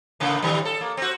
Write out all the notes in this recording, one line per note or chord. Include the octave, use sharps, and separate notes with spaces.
A2 C#3 A#3
A2 D#3 G3
A4
A#3
C4 F#4